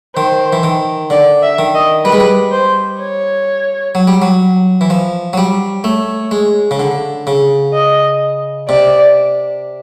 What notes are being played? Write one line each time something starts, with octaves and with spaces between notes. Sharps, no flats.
D#3 C5
E3
D#3
D3 D5
E5
D#3
D#5
G3 B4
G#3
G3
C5
C#5
F#3
G3
F#3
E3
F3
F#3
G3
A3 C#5
G#3
C#3
D3
C#3
D#5
C3 D5